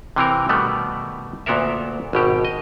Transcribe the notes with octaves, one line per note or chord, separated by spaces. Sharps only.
C3 E3 C4 A#4
B2 D#3 G3 A3 B3
D2 A#2 B3 A4 A#4 E5
G#1 B2 G4
D#5